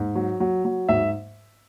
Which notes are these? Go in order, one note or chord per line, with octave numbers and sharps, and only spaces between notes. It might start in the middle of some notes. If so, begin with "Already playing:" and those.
Already playing: G#2
F#3
F#3
F#3
G#2 E5